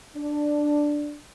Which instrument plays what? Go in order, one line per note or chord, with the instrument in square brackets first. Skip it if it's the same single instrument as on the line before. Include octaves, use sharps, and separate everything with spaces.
[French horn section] D4